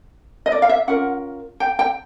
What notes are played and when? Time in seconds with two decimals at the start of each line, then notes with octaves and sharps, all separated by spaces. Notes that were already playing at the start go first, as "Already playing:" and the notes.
0.46 D#5
0.52 D5
0.62 F5
0.69 E5
0.88 C#4 F4 A#4 F#5
1.60 G5
1.79 G5